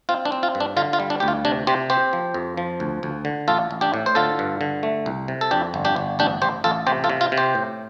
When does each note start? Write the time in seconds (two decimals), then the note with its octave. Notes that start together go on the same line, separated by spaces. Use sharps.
0.09 C4 F4
0.25 D4
0.32 C4
0.43 F4
0.55 G2
0.60 D4
0.77 D3 F4
0.93 F4
1.00 G3
1.10 D4
1.20 D2 G4
1.28 F4
1.45 C3 D4
1.67 C3 G4 C5
1.90 C4 G4 C5
2.13 F3
2.34 F2
2.57 F3
2.80 D2
3.03 D2
3.25 D3
3.48 A1 F4 A4
3.71 A1
3.81 D4 G4
3.94 A2
4.06 C5
4.15 D3 F4 A4
4.39 G2
4.61 D3
4.83 A3
5.06 C2
5.28 C3
5.41 A4
5.51 F2 D4 G4
5.74 G1
5.85 D4 G4
5.96 G1
6.19 A1 D4 G4
6.42 A1 G4 C5
6.64 A1 F4 A4
6.87 C3 G4 C5
7.04 F4 A4
7.10 C3
7.21 F4
7.32 C3
7.37 G4 C5
7.55 A2